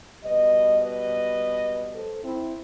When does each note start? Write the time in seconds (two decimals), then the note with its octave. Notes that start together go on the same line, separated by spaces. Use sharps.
0.24 B2 G3 B4 D#5
0.81 B4 D#5
1.95 A4 C5
2.23 C4 E4